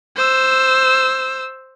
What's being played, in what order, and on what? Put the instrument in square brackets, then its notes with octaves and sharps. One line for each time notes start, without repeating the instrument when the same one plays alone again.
[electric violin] C5 E6